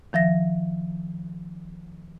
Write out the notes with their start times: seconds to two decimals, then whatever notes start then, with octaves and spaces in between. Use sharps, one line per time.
0.13 D#3 F3 E5 A#6